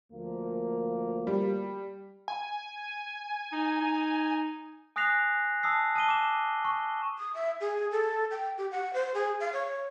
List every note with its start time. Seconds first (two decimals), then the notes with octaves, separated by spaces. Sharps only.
0.13 D2 F3 A#3
1.27 G3
2.28 G#5
3.52 D#4
3.82 D#4
4.96 G#5 D#6 F#6 A#6 C7 F7
5.63 A5 D#6 E6 C7
5.95 A5 D#6 D#7 G7
6.08 D6 E7
6.65 C#6
7.18 D#6
7.34 E5
7.61 G#4
7.91 A4
8.31 G5
8.58 G4
8.71 F#5
8.94 C5
9.14 G#4
9.40 F5
9.53 C#5